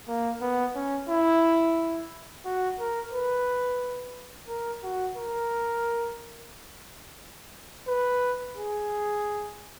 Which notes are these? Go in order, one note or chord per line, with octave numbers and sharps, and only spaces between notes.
A#3
B3
C#4
E4
F#4
A#4
B4
A#4
F#4
A#4
B4
G#4